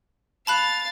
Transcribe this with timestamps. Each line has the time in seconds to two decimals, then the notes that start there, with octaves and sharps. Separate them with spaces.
0.47 F5 A5 B5 F#6 A6